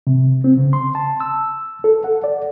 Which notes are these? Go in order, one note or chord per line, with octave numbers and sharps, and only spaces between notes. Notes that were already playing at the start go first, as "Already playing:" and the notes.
C3
C4
C#3
C6
A5
E6
A4
F#5
D5